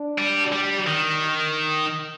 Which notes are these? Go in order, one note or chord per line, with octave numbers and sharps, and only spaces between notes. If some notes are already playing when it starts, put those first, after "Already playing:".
Already playing: D4
G3
G3
D#3